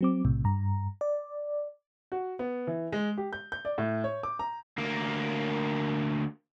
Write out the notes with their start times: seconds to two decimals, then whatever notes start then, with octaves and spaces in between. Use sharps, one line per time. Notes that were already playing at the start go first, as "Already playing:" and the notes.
0.01 F#3 C4 D6
0.25 B1 A2 C3
0.44 G2 A#5
1.01 D5
2.12 F#4
2.39 B3
2.67 E3
2.92 G#3
3.17 G4
3.33 G6
3.52 G6
3.65 D5
3.78 A2
4.04 C#5
4.23 D6
4.39 A#5
4.78 D2 A#3